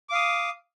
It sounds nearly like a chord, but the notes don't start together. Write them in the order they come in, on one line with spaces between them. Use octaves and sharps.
D6 F5 D#6